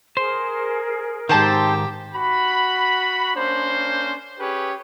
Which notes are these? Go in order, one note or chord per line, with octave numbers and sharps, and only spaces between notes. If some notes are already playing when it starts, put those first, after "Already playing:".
G#4 A#4 C5
G#2 D#3 C4 G4 C5 A5
F#4 B5
A#3 C#4 D4 C5
C#4 G4 G#4 B4 C#5